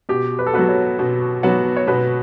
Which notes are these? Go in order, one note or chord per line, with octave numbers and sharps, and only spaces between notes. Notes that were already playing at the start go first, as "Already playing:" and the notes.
B2 G4
B4
A4
F#3 B3 F#4 B4
C#5
B2
F#3 B3 F#4 C#5
C#5
B2 B4